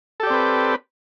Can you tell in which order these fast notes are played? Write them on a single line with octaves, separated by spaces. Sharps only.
A4 G4 D5 C4 B4